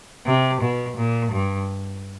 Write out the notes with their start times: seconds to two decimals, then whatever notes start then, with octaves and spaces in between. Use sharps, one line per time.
0.26 C3
0.61 B2
0.97 A#2
1.32 G2